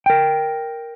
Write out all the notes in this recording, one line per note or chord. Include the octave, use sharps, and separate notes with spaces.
A#4 G5